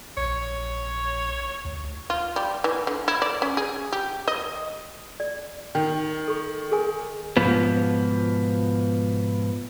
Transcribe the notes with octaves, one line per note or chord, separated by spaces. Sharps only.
A#1 C#5
D2
F4
G3
E3
D3
E4
D5
C#4
G#4
G4
D#5
D5
D#3 G5
A4 C#6
G#4 A#4 G#5
G#2 B2 F3 B3